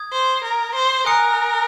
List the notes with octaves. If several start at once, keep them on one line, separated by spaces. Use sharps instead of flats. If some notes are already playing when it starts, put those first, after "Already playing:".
Already playing: D#6 G#6
C5
A#4
C5
A#4 G#5 D#6 F#6 C#7